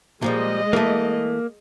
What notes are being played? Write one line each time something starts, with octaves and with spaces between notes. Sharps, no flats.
A#2 F3 G3 G#3 D#5
E3 A3 A#3